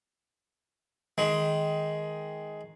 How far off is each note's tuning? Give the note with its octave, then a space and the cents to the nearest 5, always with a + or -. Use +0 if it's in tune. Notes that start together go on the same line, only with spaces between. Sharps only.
D#3 +10 G#3 +10